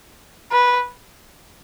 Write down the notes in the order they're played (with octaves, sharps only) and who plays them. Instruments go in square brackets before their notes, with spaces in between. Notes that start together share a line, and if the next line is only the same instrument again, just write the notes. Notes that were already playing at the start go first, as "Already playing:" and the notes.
[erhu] B4